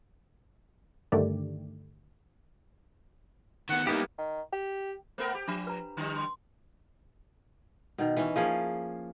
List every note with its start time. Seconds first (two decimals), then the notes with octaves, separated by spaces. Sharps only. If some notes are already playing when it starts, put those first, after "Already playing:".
1.12 G2 D3 D#3 A3 G4 D5
3.69 D#3 B3 F#5
3.87 G3 A#3 B3 D#4 E4 G4
4.18 D#3
4.52 G4
5.18 A3 B3 A#4 C5 G5
5.35 G4
5.48 F3 D4
5.67 B4 A#5
5.97 D3 G3
6.16 C6
7.98 B2 D#3
8.17 E3 C#4
8.36 F3 A#3 C#4 G#4